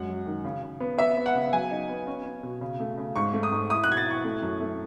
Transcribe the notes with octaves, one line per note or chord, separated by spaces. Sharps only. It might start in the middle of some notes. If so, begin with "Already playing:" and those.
Already playing: F#2 G#3 F#5
F#3
D#3
C#3
C#3
B3
B3 E5
B3
F#5
C#3
F#3 G#5
D#4
B3
C#4
C#4
B2
C#3
A3
C#3
G#2 C#6
A3
D#6
G#2
E4 D#6
F#6
B2 G#6
A6
E4 C#6
A3
F#2
A3